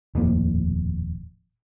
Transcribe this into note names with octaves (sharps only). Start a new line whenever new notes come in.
D#1 F2 A2 A#3